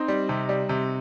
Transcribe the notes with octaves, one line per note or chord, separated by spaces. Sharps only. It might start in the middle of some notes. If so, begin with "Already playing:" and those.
Already playing: C4 D#4
G3
C3
G3
C3